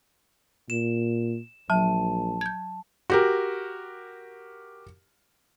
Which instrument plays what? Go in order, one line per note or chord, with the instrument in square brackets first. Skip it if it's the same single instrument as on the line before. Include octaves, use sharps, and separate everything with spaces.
[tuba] A#2 [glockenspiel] E7
[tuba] A#1 [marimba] F#3 [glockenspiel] A5
[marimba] G6 G#6
[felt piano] F#4 G4 A#4